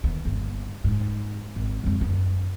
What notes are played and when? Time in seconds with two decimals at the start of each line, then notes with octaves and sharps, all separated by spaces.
0.04 D#2 B3
0.25 G1 A#3
0.84 G#2
1.56 G#1
1.84 F2 G#3
2.01 F#2 B3